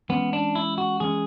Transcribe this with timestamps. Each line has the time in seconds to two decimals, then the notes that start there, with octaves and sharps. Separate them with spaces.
0.09 E3 G#3 B3 C#4
0.33 D4
0.55 E4
0.78 F#4
1.00 E3 G#3 C#4 G#4